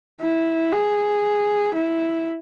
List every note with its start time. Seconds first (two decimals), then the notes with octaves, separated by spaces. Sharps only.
0.21 E4
0.72 G#4
1.75 E4